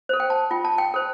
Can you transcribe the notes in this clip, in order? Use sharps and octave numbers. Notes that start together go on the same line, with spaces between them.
A4 C5
G5
A5
F4 G5
A5
G5
A4 C5